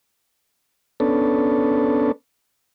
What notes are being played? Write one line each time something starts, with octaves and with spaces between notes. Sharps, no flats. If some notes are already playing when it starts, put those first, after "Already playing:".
B3 C#4 D4 A4